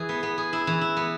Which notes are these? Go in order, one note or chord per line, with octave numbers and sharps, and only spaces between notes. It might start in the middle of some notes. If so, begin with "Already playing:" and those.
Already playing: E3 G#4
B3
B3
G#4
E4
E3
E4
B3